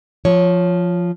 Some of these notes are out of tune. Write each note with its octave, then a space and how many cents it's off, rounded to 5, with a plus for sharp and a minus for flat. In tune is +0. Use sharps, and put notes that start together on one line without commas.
F3 +0 C#5 +0